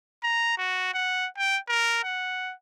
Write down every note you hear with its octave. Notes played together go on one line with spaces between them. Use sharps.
A#5
F#4
F#5
G5
A#4
F#5